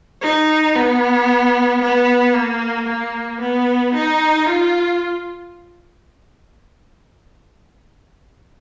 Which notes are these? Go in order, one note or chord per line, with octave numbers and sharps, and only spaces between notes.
D#4
B3
B3
A#3
A#3
B3
D#4
F4